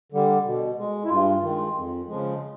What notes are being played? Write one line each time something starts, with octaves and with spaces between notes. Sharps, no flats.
D3 G3
B2
G#3
E4
G2 F4
D#3 G#3
F2
C#3 F3 G#3